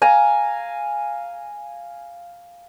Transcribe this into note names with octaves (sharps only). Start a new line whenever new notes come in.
F5 G#5 A#5